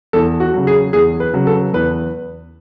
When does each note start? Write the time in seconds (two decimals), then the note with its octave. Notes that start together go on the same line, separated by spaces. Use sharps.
0.13 E2 A4
0.40 F#4
0.54 C#3 F#3
0.67 G#4
0.93 E2 G#4
1.20 B4
1.34 C#3 F#3
1.47 A4
1.73 E2 B4